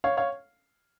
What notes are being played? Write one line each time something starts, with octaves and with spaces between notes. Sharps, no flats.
C#5 F5
C#5 F5